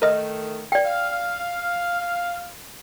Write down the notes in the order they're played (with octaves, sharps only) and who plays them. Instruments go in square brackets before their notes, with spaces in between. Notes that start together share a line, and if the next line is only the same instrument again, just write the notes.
[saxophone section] D#3 A3 [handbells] A#4 D#5 F6
[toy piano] D5 G5
[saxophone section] F5